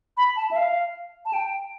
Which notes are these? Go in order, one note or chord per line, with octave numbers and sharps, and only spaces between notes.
B5
A5
E5
F5
A5
G5